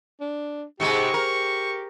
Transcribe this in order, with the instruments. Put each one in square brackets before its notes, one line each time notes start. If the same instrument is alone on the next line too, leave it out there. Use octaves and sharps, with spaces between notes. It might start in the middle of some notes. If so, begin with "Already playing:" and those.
[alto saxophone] D4
[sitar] G#2 C3 G#3 [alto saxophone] G4 [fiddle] C#6
[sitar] A#4